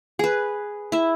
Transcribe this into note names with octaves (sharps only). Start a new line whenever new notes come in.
G#4 B4
E4 E5